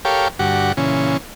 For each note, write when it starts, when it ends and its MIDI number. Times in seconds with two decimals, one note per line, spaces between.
0.05 0.28 67
0.05 0.28 69
0.05 0.28 70
0.05 0.28 73
0.05 0.28 77
0.05 0.28 79
0.39 0.72 43
0.39 0.72 50
0.39 0.72 66
0.39 0.72 67
0.39 0.72 78
0.77 1.17 46
0.77 1.17 49
0.77 1.17 52
0.77 1.17 61